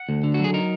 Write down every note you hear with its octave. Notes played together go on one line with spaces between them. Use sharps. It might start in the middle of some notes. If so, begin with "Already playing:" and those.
Already playing: F#5
D2
D3
F#4
F#3 G#4
D#4 A#4